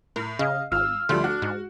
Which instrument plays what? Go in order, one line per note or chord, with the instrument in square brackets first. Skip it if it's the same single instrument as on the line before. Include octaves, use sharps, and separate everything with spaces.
[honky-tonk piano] A2 [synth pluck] A#4
[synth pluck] C#3 [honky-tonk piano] D#5 [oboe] F5
[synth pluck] G#1 [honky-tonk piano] F4 [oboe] E6 [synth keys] F6
[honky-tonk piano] D2 F3 G3 [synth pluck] A3 [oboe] C6
[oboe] D4 [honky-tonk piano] F#4
[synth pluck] G#2